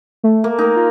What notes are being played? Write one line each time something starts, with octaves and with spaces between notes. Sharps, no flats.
A3
A#3
D#4 A#4
F4